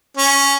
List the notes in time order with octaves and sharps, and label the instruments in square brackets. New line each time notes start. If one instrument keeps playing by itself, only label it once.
[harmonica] C#4